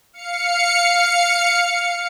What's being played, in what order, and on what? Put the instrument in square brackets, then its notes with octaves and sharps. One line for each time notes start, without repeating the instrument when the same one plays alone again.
[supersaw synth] F5 C#7